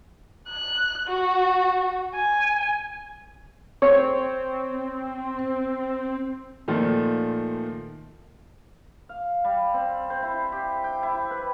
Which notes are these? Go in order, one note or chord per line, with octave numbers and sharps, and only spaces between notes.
F#6
F#4
G#5
C4 C#5
A#2 D#3 F3 A3
F5
G3
C4
C5
E4
G4
G5
E4
B4